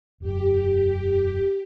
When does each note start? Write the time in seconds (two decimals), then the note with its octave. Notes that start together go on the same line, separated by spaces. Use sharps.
0.20 E1 F#2 G4